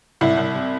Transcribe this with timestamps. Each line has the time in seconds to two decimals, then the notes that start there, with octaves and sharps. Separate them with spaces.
0.21 C2 E4
0.37 C2
0.55 C3